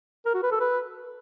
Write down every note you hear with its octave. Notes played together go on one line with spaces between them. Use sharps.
A#4
F#4
B4
A4
B4